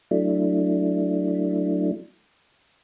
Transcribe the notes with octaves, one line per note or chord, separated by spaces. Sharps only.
F#3 A3 D4 E4